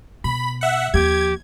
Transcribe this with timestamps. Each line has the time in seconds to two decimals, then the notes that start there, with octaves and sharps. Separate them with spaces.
0.24 B2 B5
0.61 E5 F#5
0.94 D#2 F3 G4 G#6